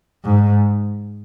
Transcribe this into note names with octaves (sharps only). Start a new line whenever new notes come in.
G#2